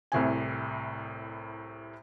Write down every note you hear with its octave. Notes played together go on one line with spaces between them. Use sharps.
C2 A2 C3 G#5